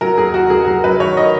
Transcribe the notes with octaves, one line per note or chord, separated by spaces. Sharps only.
F#3 A#4
D#2 G#4
F#3 F#4
F#3 G#4
F#3 A#4
F#3 B4
D#3 C#5
D#3 D#5